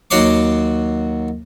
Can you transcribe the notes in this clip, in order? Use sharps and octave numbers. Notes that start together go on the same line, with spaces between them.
D#2 F#3 F#4 C#5 C6 D6